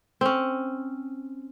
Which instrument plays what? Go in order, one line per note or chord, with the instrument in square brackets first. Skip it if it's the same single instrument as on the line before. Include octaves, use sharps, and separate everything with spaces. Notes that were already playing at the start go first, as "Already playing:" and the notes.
[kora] C4 C#4